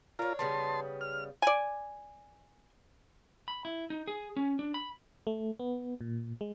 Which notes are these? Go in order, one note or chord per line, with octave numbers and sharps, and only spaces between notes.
D4 F4 A#4 C#5
C#3 G3 B3 A5 C6
F6
D5 G#5
B5
E4
D#4
G#4
C#4
D4
B5
A3
B3
A#2
G#3